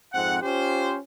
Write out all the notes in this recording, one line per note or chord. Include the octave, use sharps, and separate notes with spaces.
F2 G#2 C4 F#5
C#4 F4 G4 C5